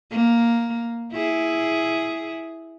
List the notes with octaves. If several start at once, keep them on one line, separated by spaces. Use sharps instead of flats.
A#3
E4 G#4